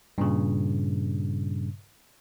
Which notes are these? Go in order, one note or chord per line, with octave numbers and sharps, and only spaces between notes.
G2 A#2 C#3